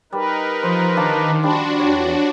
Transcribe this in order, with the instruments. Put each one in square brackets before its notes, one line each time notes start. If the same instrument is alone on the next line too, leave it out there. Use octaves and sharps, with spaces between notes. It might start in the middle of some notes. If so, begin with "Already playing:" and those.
[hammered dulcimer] G3 [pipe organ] D#4 A#4 B4
[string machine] F3 [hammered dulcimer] C5 D#5
[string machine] D#3 [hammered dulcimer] D4 F5 A5
[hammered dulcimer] F3 G3 C6 [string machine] D4 F#4
[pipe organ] E2 [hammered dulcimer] C#5 A5